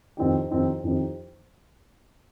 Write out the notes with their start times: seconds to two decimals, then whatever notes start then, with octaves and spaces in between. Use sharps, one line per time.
0.17 F2 D#3 C4 D#4 G4
0.50 F2 D#3 C4 D#4 G4
0.84 F2 D#3 C4 D#4 G4